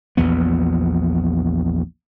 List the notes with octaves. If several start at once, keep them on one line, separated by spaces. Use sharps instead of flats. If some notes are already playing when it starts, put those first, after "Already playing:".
A#1 E2 F3 B3